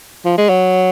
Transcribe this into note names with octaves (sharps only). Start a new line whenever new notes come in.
F3
G#3
F#3